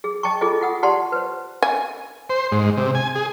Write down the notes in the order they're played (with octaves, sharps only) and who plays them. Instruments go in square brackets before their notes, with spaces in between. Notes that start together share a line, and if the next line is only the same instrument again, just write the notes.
[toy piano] G#4
D#5 G5 A5 C#6
F4 G#4 A4 D#5
F4 F#5 D#6
G4 D5 F#5 A5 C6
B4 C5
[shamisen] G#5
[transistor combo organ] C5
G#2
C3
G#5
G#4